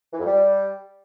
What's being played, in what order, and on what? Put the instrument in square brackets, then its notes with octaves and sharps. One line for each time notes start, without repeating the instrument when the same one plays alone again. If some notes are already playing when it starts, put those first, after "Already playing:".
[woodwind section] E3
F2
G3